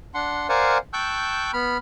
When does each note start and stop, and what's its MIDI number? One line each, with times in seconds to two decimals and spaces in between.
0.14 0.47 62
0.14 0.47 78
0.14 0.47 84
0.49 0.78 70
0.49 0.78 72
0.49 0.78 74
0.49 0.78 77
0.49 0.78 78
0.49 0.78 80
0.93 1.51 79
0.93 1.51 81
0.93 1.51 85
0.93 1.51 88
0.93 1.51 90
0.93 1.51 91
1.53 1.77 59
1.53 1.77 83
1.53 1.77 89